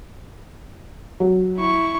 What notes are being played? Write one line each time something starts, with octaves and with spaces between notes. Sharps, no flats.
F#3
E4 C#6